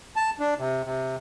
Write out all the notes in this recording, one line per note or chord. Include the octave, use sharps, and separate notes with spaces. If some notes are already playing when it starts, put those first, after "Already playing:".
A5
D4
C3
C3